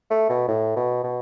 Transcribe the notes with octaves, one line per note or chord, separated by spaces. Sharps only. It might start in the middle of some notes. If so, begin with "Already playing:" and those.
A3
B2
A2
B2
B2